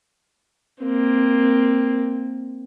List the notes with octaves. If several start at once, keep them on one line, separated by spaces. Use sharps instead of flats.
A#3 C4